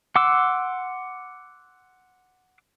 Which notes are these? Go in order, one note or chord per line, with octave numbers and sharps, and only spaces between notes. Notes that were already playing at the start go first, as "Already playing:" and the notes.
F#5 C6 D6 E6